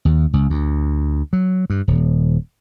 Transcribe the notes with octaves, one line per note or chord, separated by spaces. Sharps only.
D#2
C#2
D2
F#3
G2
D#1